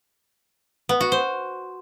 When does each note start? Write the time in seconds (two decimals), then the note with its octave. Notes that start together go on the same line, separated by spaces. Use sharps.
0.89 B3
1.01 F#4
1.12 C5